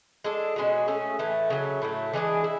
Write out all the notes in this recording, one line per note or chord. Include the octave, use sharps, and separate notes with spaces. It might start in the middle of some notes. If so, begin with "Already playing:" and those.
G#3 D4 A4
B2 G#3 C#4 F#4
A3 C#4 G#4
A2 E3 A3
C#3 F#3 A3
A2 F#3 A3
E3 G#3 D4 G#4
E4